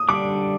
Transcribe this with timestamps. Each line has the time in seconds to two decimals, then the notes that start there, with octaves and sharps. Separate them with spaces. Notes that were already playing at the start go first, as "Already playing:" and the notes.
Already playing: D#6
0.09 D3 G3 D4 D6